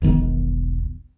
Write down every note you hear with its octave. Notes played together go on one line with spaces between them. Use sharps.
E1 B1 D#3 B3